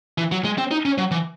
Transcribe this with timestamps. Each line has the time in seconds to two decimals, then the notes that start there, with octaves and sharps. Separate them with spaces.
0.18 E3
0.32 F#3
0.45 G#3
0.58 C4
0.71 D#4
0.85 C#4
0.98 F#3
1.11 E3